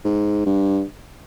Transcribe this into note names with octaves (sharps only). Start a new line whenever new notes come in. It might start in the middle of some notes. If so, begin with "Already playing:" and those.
G#2
G2